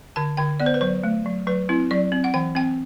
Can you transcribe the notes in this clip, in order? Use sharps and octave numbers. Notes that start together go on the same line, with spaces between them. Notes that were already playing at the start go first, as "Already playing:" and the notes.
D3 A5
D3 G5
B3 D5
C5
B4
F#3 C5
A3
F#3
F#3 B4
C4 E4
F#3 D5
C4
F#5
E3 G5
C4 G5